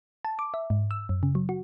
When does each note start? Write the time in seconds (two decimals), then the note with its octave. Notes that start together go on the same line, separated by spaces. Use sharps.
0.25 A5
0.39 D6
0.54 E5
0.70 G#2
0.91 E6
1.09 F#2
1.23 C#3
1.35 F#3
1.49 F#4